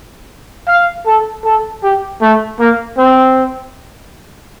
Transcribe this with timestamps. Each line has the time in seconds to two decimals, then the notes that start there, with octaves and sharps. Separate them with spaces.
0.68 F5
1.07 A4
1.45 A4
1.83 G4
2.21 A3
2.59 A#3
2.98 C4